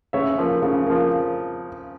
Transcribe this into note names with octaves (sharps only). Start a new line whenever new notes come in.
C#3 C#5 E5
F3 A#3
C#3
F3 A#3